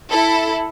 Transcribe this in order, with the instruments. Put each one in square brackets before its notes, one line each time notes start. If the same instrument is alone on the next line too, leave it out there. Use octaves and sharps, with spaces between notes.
[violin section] E4 A4